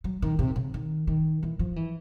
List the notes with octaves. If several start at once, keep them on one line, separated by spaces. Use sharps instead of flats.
F#3
D#3
C3
C#3
D#3
D#3
E3
F3
E3